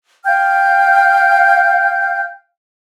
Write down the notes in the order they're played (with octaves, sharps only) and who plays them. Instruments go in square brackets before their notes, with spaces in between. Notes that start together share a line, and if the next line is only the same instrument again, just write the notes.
[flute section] F5 G5 F6 G6